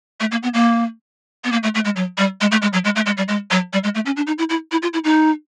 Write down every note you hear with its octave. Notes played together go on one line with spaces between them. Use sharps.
A3
A#3
B3
A#3
B3
A#3
A3
A3
G#3
F#3
G3
G#3
A3
G#3
F#3
G#3
A3
G#3
G3
G#3
F#3
G3
G#3
A3
C#4
D4
D#4
E4
E4
E4
F4
E4
D#4